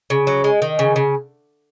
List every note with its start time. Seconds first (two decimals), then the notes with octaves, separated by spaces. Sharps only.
0.10 C#3
0.27 F#3
0.44 G#3
0.62 D#3
0.79 C#3
0.96 C#3